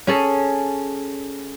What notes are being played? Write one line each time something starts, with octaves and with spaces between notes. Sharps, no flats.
C#4 G#4 A4